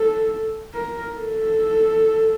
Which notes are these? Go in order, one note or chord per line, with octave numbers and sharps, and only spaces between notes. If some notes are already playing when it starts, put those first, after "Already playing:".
Already playing: A4
A#4
A4